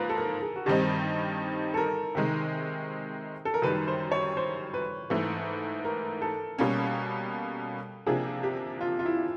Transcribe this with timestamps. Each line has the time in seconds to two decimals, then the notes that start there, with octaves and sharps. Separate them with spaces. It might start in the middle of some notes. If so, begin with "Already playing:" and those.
Already playing: G#2 F3 A#3 B4
0.09 A4
0.17 A#4
0.42 G#4
0.56 F#4
0.66 G2 D#3 G3 C4 D#4 G4
1.74 A4
1.77 A#4
2.15 C3 D#3 G#3
3.45 A4
3.54 A#4
3.62 F#2 D#3 G3 B4
3.88 C5
4.12 C#5
4.37 C5
4.74 B4
5.10 G#2 E3 A3
5.85 A#4
6.22 A4
6.58 B2 G3 A#3 C#4
8.06 C3 F3 A#3 D4 G#4
8.43 G4
8.81 F4
8.99 F4
9.06 E4